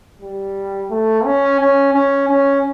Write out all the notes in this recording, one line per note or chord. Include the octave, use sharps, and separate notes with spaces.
G3
A3
C#4
C#4
C#4
C#4